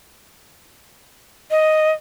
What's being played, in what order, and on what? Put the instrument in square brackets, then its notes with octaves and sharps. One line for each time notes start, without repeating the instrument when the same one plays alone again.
[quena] D#5